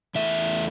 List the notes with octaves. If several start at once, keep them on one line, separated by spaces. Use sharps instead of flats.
E2 E3 A3 E5